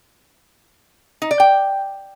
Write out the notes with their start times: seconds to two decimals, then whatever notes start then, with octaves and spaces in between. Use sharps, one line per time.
1.22 D#4
1.31 D5
1.40 G5